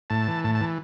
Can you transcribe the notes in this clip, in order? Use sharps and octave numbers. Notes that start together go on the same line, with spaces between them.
A2 A5
E3
A2 A5
A5
E3